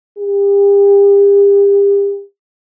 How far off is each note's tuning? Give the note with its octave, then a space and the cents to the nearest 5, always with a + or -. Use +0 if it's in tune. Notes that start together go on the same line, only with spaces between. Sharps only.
G4 +35